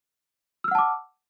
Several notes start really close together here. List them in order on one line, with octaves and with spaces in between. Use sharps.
E6 F6 F#5 A5 D6